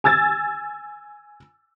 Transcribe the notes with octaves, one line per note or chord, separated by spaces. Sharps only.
G#5 E6 G#6 A6